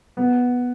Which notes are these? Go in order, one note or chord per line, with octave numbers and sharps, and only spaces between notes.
B3